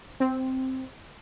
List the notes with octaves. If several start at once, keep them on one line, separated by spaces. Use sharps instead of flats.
C4